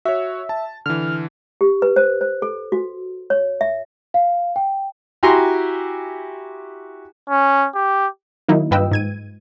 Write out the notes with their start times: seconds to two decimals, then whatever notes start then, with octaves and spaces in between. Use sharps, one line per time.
0.05 F#4 C#5 E5
0.49 A5
0.86 D3 E3 F6
1.61 G4
1.82 B4
1.96 C5
2.21 C5
2.42 A4
2.72 F#4
3.30 C#5
3.61 E5
4.14 F5
4.56 G5
5.23 E4 F#4 G4 G#5 A#5 C6
7.30 C#4
7.75 G4
8.48 D#3 F#3 A#3 D#4 E4
8.71 G2 F4 B4 D#5 G5 E6
8.91 G#2 G#6 D#7